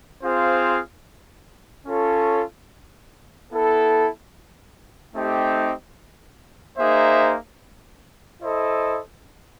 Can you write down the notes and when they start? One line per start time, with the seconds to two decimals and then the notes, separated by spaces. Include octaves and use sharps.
0.23 C4 F4 G#4 C5 F5
1.86 C#4 F4 A4 C#5
3.51 B3 E4 A4
5.14 A3 C4 D#4 G4
6.78 A#3 D#4 G#4 C5 E5
8.42 E4 A4 C5 D#5